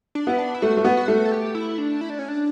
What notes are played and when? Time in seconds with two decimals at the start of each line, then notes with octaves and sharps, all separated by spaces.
0.15 D4
0.27 B3 E4
0.39 D4
0.54 E4
0.62 A3 F#4
0.77 A3
0.85 B3
0.97 F#4
1.08 A3
1.26 A4
1.32 G4
1.55 E4
1.78 D4
2.01 E4
2.10 D4
2.19 C#4
2.28 D4